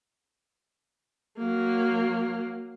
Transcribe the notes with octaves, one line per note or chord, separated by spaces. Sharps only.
F#3 A#3